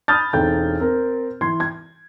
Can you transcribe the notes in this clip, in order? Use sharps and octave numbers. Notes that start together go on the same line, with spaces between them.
A5 B5 D#6 F6 G6 A6
E1 C4 D#4 A4 G5 G6
C4 A#4
E3 C6 G#6
G#6